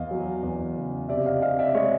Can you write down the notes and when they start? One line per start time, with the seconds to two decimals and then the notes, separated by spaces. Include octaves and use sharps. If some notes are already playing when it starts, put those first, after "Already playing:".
Already playing: E2 D#5 F5
0.11 F#3
0.43 E2
0.76 C#3
1.09 C3 D5 E5
1.26 D#5 F5
1.42 C3 D#5 F5
1.59 D5 E5
1.75 G#3 C#5 D#5